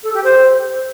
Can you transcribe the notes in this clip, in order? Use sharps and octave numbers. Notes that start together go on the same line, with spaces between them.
A4
G4
C5